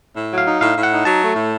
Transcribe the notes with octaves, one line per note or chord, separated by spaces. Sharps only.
A2
F#3
F5
D#4
A2 F5
A2
F#5
D#4
F#3 A5
A3
A2